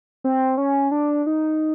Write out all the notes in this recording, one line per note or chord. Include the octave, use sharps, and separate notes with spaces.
C4
C#4
D4
D#4